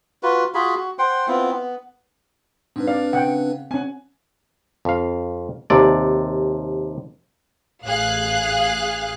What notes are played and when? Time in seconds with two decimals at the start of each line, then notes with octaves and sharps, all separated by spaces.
0.23 F4 F#4 B4
0.54 F4 F#4 G#4 B5
0.76 F#4
0.99 C5 F#5 G5 C6
1.28 B3 C4 E4 F4
1.52 B3
2.76 G#2 C4 D4 B4
2.87 D5 F5
3.13 C#3 F#5 G5
3.71 C4 C#4 F#5 G#5
4.85 F2 F5
5.70 D#2 C3 D5
7.86 A1 G#4 F5 F#6